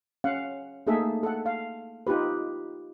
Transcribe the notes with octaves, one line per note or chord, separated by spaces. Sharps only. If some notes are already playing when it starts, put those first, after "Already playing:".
C#4 F5 F#5
A3 A#3 D#4 G#4 A4 E5
A4 F#5
F5
D#4 F4 G4 B4